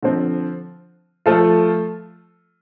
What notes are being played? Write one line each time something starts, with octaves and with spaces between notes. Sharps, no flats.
D3 F3 C4
F3 A3 F4 A4